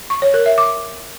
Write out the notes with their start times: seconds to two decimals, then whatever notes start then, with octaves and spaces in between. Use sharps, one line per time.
0.10 C#6
0.22 C#5
0.34 A#4
0.46 E5
0.58 D6